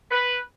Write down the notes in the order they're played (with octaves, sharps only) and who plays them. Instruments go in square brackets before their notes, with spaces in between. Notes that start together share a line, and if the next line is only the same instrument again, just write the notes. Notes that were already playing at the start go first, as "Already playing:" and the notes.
[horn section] B4